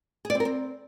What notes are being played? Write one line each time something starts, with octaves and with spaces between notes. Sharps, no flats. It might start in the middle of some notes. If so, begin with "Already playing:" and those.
G#4
D5
C4
A#4
C4